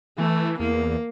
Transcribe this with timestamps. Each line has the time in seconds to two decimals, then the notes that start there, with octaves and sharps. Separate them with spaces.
0.18 E3 A3
0.59 E2 A#3